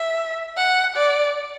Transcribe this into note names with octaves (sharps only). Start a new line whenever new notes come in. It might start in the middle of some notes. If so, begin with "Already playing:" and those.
Already playing: E5
F#5
D5